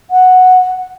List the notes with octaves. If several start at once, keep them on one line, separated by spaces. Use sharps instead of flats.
F#5